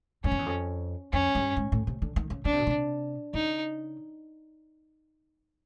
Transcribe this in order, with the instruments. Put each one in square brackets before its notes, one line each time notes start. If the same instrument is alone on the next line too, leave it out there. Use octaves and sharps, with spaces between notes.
[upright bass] F#2 [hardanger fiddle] C#4
[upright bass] F2
E2
F2
[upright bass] F2 [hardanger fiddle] C#4
[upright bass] G2
G#2
A2
C3
D3
D#3
C#3
[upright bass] C#3 [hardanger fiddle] D4
[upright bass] C3
B2
C3
[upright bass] C#3 [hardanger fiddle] D#4